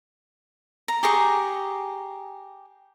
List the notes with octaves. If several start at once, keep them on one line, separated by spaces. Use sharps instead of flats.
A#5
G4 G#4 A#5 C#6